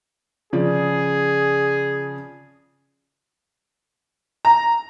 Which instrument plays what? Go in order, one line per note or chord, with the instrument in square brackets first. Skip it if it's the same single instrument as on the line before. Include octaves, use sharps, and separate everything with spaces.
[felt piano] C#3 F3 D5 [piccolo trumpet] G#4
[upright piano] A#5